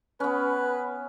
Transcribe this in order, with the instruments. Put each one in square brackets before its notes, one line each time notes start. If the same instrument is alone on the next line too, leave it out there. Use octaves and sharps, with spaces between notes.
[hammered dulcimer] B3 C#4 [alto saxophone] B4